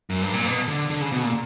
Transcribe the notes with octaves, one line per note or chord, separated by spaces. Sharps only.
F#2
G2
A#2
B2
D3
D3
C#3
B2
A#2